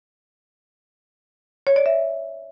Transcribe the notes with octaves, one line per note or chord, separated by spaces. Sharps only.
C#5
D5
E5